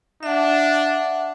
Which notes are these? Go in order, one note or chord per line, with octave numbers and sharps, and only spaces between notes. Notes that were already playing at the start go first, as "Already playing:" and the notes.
D4 E5 F#5